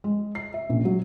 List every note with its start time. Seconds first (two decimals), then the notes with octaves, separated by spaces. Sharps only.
0.04 G#3
0.35 C7
0.54 E5
0.69 A#1
0.85 F#3